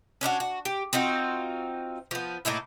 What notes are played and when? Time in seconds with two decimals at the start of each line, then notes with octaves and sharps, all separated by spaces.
0.21 C#4 D4 E4 F#4
0.40 F#4
0.65 G4
0.93 C4 D#4 F4 F#4
2.11 F3 B3
2.45 A2 A#3 D#4 E4